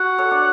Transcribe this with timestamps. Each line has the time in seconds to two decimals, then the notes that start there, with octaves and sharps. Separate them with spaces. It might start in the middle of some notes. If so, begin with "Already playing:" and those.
Already playing: F#4 F#5
0.18 A4 C#5
0.31 D4